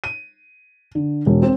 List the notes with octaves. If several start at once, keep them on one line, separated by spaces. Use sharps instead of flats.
D#7
D3
E1
C4